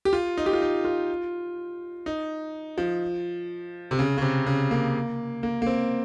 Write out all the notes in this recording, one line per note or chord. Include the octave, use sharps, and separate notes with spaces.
G4
F4
D#4
G4
F4
D#4
F4
D#4
F3
C3
C#3
C#3
C3
C#3
A#3
A#3
A#3
C4